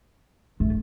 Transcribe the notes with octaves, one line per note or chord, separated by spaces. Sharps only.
A3